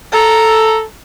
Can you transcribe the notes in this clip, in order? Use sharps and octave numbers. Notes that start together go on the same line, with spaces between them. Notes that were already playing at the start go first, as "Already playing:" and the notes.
A4 A#5